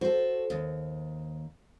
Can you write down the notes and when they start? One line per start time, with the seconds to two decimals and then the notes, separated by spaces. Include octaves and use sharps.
0.01 F#4 A4 C5
0.50 D#2